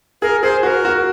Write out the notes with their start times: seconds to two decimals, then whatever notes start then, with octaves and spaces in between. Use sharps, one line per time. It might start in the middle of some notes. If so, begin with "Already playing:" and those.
0.22 G#4 A#4
0.42 G#4 C5
0.63 F#4 C5
0.67 A#4
0.85 F#4